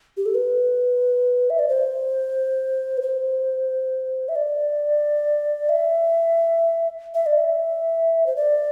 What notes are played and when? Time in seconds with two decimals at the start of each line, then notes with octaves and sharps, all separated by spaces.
0.17 G4
0.26 A4
0.35 B4
1.50 E5
1.59 D5
1.69 C5
2.98 B4
3.02 C5
4.29 E5
4.35 D5
5.69 E5
7.14 E5
7.26 D5
7.38 E5
8.27 C5
8.36 D5